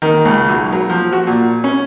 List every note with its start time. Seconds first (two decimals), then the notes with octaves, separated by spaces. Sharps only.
0.02 D#3
0.25 C#2
0.49 B1
0.72 F#3
0.90 F3
1.13 F#4
1.27 A#2
1.64 C#4